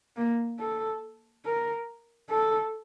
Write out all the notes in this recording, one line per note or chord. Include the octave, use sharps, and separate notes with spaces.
A#3
A4
A#4
A4